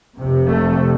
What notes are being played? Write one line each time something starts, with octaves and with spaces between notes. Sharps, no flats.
F1 F2 C3
A3